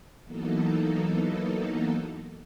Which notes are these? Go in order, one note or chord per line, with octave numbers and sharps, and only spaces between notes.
E3 F#3 A#3 B3 D#4 A4